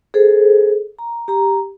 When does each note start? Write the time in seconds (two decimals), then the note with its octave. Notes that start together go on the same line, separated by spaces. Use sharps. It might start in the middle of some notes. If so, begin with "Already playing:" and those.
0.14 G#4 A4 C5
0.99 A#5
1.28 G4 A#5